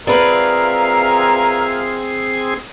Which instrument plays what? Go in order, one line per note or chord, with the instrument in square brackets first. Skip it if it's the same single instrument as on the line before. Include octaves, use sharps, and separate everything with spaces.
[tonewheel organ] C4 G#4 [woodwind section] F4 E5 F5 [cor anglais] A#4 [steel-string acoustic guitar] B4 D5